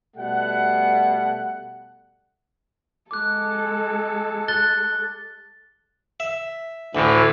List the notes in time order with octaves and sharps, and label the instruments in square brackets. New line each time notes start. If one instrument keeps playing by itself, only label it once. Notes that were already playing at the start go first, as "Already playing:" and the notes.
[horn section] B2 G3 A3 F#5
[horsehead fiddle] G#3 A4 [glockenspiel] D6 F#6
[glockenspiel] F#6 A6 G7
[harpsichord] E5
[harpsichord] D2 [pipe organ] A2 D3 E3